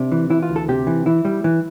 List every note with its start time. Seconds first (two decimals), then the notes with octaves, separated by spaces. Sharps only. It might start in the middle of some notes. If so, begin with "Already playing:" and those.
Already playing: C3 D4
0.12 E3
0.30 E3 E4
0.43 F4
0.49 D2
0.56 A4
0.68 C3 G4
0.87 E3
1.06 E3 E4
1.25 G3
1.44 E3